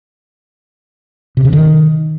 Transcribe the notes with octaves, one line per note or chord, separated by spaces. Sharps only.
C3
C#3
D#3